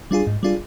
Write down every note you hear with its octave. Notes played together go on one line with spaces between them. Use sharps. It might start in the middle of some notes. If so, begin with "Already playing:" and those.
G3 D4 F4 G#4
G#2
G3 D4 F4 G#4